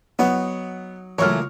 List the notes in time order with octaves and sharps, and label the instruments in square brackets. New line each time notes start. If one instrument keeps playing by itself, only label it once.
[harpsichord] F#3 D#4 C#5 [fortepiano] B3
[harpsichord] C#2 A#3 [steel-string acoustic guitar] E3 F#3 A3 [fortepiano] C#5 F6